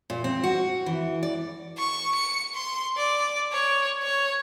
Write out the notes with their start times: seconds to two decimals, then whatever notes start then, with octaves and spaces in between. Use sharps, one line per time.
0.10 A#2
0.24 C4
0.44 F#4
0.86 E3
1.23 D5
1.77 C#6
2.15 C#7
2.55 C6
2.97 D5
3.52 C#5
4.03 C#5